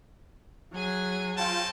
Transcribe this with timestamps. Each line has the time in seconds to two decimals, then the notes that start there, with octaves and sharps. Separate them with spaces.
0.75 F#3 G#4 G#5
1.37 C4 C#4 F4 G5 A5